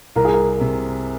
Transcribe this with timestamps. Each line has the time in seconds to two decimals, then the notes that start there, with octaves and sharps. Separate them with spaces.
0.16 C2 A#4
0.25 G#4
0.34 A#4
0.61 C3